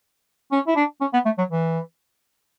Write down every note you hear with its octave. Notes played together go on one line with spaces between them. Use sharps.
C#4
E4
D4
C#4
B3
A3
F#3
E3